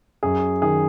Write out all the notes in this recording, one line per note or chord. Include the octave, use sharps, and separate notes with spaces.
F#2 G#4
D#3 G#4